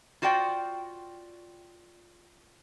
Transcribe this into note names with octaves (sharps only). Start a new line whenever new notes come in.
F4 F#4 C5 D5 G5